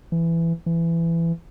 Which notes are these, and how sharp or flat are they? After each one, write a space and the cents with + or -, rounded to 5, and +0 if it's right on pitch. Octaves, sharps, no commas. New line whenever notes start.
E3 +15
E3 +20